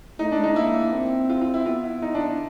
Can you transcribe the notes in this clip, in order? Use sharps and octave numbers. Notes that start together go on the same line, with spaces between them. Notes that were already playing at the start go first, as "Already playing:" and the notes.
A3 D#4
D4
G#3
D#4
A#3 E4
C4
F4
F4
E4
B3 F4
E4
D#4
D4